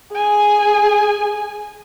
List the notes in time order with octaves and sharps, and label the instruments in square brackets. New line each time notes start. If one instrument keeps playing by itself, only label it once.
[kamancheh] G#4 [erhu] G#5